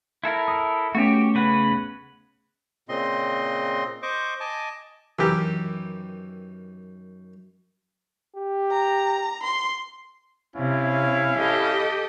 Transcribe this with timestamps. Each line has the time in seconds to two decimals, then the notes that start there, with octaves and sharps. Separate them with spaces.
0.24 E4 A4 A#4
0.48 D#6
0.95 A3 B3 C#4 F#4 G4
1.35 C#3 B4 F#5
2.89 A#2 C#3 C4 D#5 C6
4.02 C5 D#5 C#6 D6
4.40 D#5 G#5 A5 D6
5.19 F#2 D#3 E3 G4 A#4
8.36 G4
8.71 A#5
9.43 C6
10.55 C3 C#4 E4 F5
11.37 G4 A4 D#5